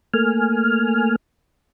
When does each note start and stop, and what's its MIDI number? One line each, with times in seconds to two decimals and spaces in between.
0.14 1.16 57
0.14 1.16 58
0.14 1.16 80
0.14 1.16 89